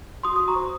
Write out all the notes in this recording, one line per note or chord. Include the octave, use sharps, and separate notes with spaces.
F#4 C6 D#6
F#4 D#6
A#5 C#6
C5